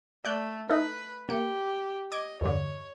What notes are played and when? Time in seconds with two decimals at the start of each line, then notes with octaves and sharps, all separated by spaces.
0.25 A3 D5 F#6 G6
0.69 D#4 E4 A4 B4
1.29 A#3 G4 C#7
2.12 D#5 D6 G#6 D7
2.41 E2 G2 D3 C#5